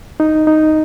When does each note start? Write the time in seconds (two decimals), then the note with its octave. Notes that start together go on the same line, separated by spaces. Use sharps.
0.20 D#4
0.47 D#4